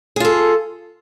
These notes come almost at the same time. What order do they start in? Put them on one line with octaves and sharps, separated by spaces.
G#4 F4 A4